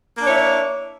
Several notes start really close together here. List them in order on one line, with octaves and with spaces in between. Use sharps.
A#3 D4 C#5 E4